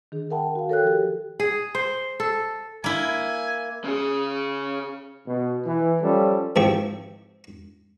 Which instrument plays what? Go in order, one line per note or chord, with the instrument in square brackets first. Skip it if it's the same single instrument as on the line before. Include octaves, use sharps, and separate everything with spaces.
[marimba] D#3 D4 G#4
A#4 E5 F#5 G5 A5 B5
F#4 F5
A4 A#4 C#5 G5 F#6
F3 G4
[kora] G#4
C5
A4
[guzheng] A#3 E4 [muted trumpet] G#5
[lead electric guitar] C#3 G#4
[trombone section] B2
E3
F3 G3 C#4 A4
[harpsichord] G#2 E3 F3 C4 G4 C#6